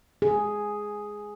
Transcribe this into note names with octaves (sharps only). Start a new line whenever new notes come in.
G#4